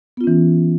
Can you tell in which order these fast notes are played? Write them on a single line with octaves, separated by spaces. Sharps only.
B3 F4 C#4 E3